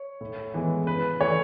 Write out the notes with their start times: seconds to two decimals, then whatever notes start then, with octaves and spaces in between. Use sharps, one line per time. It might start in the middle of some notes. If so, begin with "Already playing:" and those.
Already playing: C#5
0.21 A2
0.54 E3 G#3 B3
0.87 C#3 B4
1.20 E3 A3 C#5